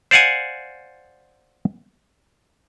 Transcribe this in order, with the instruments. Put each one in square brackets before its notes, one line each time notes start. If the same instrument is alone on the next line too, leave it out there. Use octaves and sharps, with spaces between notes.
[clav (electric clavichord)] C5 D5 F5 F#5 G#5